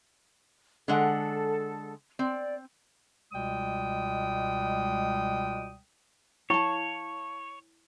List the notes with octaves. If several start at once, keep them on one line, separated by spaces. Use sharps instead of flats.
D3 G#3 A4 F#5
C4 D5
C#2 B2 G3 G#3 G5 D#6
E4 C#5 F5 A5 C#6